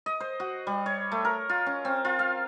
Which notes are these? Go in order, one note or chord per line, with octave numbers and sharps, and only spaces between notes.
D#5
C5
F#4
G3
C#5
A3
A#4
F4
C#4
C4
F4
F5